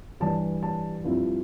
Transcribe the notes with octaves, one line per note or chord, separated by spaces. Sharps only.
G2 E3 G3 D4 A5
A5
G2 F3 C4 E4